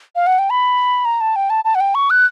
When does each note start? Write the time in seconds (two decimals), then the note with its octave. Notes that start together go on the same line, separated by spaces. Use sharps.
0.16 F5
0.27 F#5
0.39 G5
0.50 B5
1.05 A#5
1.21 A5
1.36 G5
1.50 A5
1.65 A5
1.75 F#5
1.80 G5
1.95 C#6
2.10 F#6